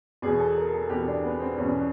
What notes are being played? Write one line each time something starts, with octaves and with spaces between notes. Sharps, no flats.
E2 B2 G#4
A4
A#4
A4
E2 B2 G4
D4
B3
C4
E2 B2 C#4